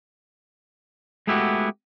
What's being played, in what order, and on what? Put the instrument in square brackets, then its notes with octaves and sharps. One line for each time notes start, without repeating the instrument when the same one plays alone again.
[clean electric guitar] G#3 A3 B3 E4 F#4 G4